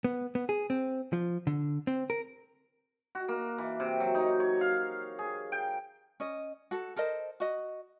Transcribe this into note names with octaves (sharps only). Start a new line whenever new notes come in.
B3
B3
G#4
C4
F3
D3
C4
A#4
F#4
A#3
E3
C3
F#3
D#4
C#5
F5
G#4
G5
C#4 D#5
F#4 A4
A4 A#4 C5 D#5
F#4 D#5